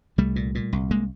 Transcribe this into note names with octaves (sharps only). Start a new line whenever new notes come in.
C2 G3 A3
A#2
A#2
C2
G#3 A#3